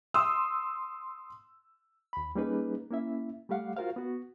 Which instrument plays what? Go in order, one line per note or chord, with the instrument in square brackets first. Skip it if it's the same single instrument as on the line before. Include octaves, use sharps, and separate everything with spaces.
[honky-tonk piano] C6 D#6 E6
[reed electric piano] D#2 B5
G3 A#3 C#4 D#4 G#4 B4
A#3 C#4 E4 E5
G3 A3 G4 F5 F#5
F4 F#4 A#4 C5 F5
B3 F#4